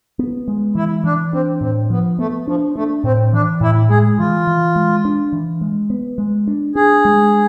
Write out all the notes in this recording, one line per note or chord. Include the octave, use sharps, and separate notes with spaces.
B3
G#3
E3 E4
E3 D4
C4 D4
A2 C4
F3 B3
A3 B3
F3 D4
A3 D4
A2 C4
E3 D4
A2 E4
G#3 G#4
E3 F4
E3
G#3
D4
E3
G#3
B3
G#3
D4
D4 G#4
G#3